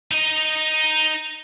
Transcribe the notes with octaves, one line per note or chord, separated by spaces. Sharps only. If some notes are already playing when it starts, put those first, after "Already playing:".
D#4 D#5